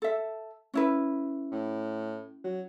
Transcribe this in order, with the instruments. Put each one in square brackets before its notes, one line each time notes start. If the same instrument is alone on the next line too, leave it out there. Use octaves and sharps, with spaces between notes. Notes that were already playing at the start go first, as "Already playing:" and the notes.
[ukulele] A4 E5
C#4 E4 B4
[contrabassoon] A2
F#3